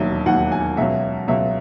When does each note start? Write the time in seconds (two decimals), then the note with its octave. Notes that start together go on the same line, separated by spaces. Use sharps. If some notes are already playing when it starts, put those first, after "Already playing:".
Already playing: E1 D#2 D#3 F#3 E5
0.26 E1 D#2 D#3 F#3 F#5
0.52 G#5
0.77 C#2 B2 F#3 E5
1.28 C#2 B2 F#3 E5